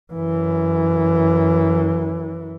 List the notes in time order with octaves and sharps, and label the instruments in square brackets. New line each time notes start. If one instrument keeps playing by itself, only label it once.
[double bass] F#2 E3